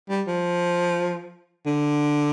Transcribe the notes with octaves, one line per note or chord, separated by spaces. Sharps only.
G3
F3
D3